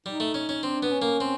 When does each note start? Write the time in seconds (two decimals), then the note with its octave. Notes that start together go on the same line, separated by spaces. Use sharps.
0.06 G3 D#4
0.20 A3
0.34 C#4
0.49 C#4
0.63 C4 D4
0.83 B3
0.91 C#4
1.02 A#3
1.20 C4